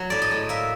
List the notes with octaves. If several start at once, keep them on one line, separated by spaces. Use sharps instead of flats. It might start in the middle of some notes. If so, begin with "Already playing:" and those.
Already playing: F#3
A2 D5
D#5
A2
A#3 E5